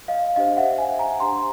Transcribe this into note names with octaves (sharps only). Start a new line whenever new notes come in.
D#5 F5
D4 G4 C5 D#5 F5
E5 F#5
F#5 G#5
G#5 A#5
D4 G4 C5 A#5 C6